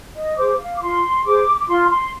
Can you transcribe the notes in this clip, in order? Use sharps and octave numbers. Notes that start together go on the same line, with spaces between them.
D#5
G#4 C5 D6
F5
D6
F4 C6
G#4 C5 D6
D6
F4 C6
C6